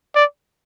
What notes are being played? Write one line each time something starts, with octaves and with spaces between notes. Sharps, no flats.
D5